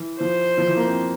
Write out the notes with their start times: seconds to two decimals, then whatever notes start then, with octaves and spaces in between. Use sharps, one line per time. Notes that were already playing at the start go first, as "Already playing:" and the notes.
Already playing: E3
0.20 F3 C5
0.58 F3
0.67 E3
0.76 A#3
0.86 C4